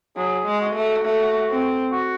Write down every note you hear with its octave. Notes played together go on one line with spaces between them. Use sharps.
F#3 G#4
G#3
F#4
A3
A3
C4
F#4